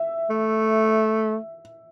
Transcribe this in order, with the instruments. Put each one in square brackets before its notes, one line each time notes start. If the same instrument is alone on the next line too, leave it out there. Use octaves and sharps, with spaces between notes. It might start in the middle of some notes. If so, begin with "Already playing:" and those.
Already playing: [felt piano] E5
[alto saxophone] A3